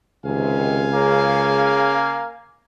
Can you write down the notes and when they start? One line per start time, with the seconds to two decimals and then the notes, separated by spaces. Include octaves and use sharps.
0.24 C#2 C3 D#3 F5 G#5
0.93 C#3 A#3